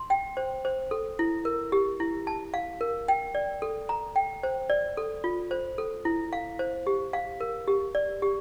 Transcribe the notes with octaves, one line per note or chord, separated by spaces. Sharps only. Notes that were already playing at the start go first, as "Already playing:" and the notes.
Already playing: C6
G5
C5
C5
A4
E4
A#4
G4
E4
A5
F5
A#4
G5
D5
A4
A#5
G5
C5
D5
A4
F4
C5
A4
E4
F5
C5
G4
F5
A#4
G4
D5
G4